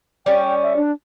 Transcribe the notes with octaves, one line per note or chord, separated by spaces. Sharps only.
G3 C#4 G5
E5
D4